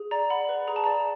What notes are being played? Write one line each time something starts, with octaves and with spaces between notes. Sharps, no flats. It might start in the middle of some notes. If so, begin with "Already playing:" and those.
Already playing: G#4
D5 A#5
F#5 B5
B4
G#4 A#5
A5
D5 A#5